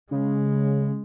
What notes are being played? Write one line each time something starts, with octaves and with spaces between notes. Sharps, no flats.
C#3 G#3